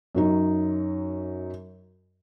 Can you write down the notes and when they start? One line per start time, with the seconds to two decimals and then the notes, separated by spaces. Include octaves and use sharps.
0.15 F#2 F#3 D#4